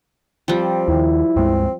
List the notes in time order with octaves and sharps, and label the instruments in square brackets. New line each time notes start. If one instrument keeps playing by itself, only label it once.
[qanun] F3 G3 [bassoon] C4
[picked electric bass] D#2 D#3 [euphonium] E4
[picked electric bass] C#2 G2 G#3 [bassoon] C4